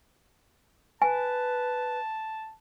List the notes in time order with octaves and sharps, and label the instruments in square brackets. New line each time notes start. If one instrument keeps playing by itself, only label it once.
[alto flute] B4 [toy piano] G#5 [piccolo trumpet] A5